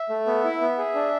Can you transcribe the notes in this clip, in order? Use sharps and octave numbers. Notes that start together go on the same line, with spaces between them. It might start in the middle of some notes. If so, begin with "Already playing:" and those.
Already playing: E5
A3
B3
E4
B3
G#4
D4